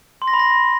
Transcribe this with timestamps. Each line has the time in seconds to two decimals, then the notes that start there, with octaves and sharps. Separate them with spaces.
0.22 C6
0.28 A#6
0.33 B5
0.39 A#6